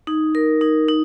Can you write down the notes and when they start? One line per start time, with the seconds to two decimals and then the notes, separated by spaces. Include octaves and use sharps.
0.07 D#4
0.35 A#4
0.61 D#4
0.88 D#4